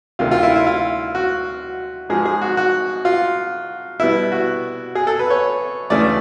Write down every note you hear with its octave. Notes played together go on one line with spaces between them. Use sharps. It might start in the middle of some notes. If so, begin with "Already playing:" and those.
D2 C3 D#3 F4
F4
E4
E4
F4
F#4
G#2 F3 G#3 G#4
G#4
F#4
F#4
F4
B2 G3 B3 E4
F#4
G#4
A4
B4
C#5
D2 C#3 E3 A3 C#4 D5